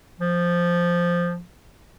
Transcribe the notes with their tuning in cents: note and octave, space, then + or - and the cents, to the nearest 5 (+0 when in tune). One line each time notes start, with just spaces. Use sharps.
F3 -5